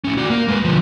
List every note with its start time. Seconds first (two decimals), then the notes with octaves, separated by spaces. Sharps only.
0.04 A2 C#4
0.17 F#4 D5
0.30 A#3
0.48 G#3 B4
0.64 D3 F3